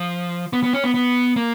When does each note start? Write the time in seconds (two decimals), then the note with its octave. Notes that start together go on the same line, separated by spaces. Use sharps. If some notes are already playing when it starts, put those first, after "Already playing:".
Already playing: F3
0.53 B3
0.63 B3
0.73 C#4
0.84 B3
0.94 B3
1.36 A#3